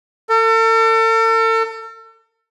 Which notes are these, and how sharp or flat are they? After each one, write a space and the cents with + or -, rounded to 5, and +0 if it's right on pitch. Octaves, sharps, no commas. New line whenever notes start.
A4 +40